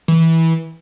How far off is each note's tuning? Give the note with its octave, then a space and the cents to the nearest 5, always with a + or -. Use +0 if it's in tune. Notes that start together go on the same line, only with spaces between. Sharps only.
E3 -15